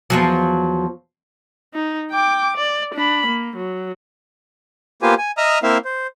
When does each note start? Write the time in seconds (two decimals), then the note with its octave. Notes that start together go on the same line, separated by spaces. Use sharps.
0.10 E2 F3 F#3
1.74 D#4
2.11 G5 D6
2.57 D5
2.95 D4 B5
3.27 A#3
3.56 F#3
5.02 A#3 B3 F4 G4 C5 G#5
5.18 G#5
5.37 D#5 E5 A#5 D#6 F6
5.63 A#3 C4 E4 E5 F5
5.85 C5